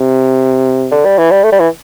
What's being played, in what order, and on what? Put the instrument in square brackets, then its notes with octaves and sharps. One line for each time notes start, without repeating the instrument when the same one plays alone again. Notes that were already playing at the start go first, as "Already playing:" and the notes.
Already playing: [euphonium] C3
[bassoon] D3
G3
E3
G3
A3
G3
E3